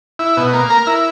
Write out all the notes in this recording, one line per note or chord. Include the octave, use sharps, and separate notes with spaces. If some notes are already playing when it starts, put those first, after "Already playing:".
E4
B2
A#3
A#4
E4